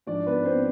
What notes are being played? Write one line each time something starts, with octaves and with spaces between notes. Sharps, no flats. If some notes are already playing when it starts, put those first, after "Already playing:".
G#2 F3 G#3 D4 D5
B3 B4
C4 C5